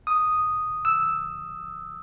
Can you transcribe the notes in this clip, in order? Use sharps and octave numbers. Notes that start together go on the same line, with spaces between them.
D#6
E6